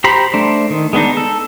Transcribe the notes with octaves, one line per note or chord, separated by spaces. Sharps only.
G4 C5 A#5 B5
A3 D4 C5
D#3
G#3 B3 D4 D#4
A4